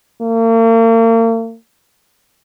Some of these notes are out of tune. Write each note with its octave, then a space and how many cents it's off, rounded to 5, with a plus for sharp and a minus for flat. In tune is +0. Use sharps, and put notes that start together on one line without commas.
A#3 -40